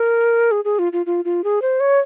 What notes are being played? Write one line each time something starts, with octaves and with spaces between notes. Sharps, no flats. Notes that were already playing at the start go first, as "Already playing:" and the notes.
Already playing: A#4
G#4
G#4
F4
F4
F4
F4
G#4
C5
C#5